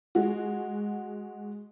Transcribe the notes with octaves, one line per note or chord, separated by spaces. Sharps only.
G#3 F#4